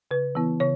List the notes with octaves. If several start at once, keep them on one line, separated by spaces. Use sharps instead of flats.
C#3 B4
E3 B3 E4
C#3 C#5